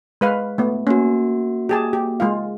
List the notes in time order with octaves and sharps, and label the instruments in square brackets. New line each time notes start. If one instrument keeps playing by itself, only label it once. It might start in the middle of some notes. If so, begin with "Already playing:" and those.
[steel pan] G#3 B4 F5
A3 B3
[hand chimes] A#3 F#4 [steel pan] C#4
[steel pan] G4 G#4 A5
G4
G#3 F4 F5